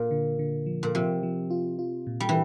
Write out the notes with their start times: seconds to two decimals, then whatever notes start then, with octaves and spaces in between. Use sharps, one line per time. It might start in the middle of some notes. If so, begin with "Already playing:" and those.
Already playing: A#2
0.11 D3
0.39 D3
0.66 F3
0.83 A#2
0.95 C3 F3
1.23 F3
1.50 F4
1.79 F4
2.07 A#2
2.20 G3
2.29 E3